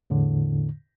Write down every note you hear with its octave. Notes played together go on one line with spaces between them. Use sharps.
E2 A2 D3